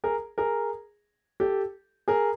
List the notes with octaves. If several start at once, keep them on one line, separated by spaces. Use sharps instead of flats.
G#4 A#4
G#4 A#4
G4 A4
G#4 A#4